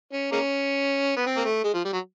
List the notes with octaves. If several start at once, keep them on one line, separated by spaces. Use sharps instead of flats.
C#4
G#3 A#3 C#4
B3
C4
A#3
A3
G#3
F3
G3
F#3